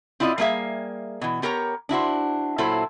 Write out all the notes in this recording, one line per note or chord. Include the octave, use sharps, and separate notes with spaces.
C4 E4 F4 D5 D#5
G3 A3 A#3 G#4 E5 F5
B2 E3
B3 G4 A#4 C#5 A#5
D4 E4 F#4 C5
A#2 F#3 E4 A4 C5